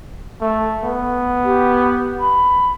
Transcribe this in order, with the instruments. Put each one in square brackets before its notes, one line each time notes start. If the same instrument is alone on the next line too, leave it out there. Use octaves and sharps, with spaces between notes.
[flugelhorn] A3
B3
[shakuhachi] G4
B5